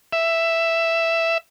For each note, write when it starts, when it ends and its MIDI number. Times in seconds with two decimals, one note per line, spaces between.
0.13 1.38 76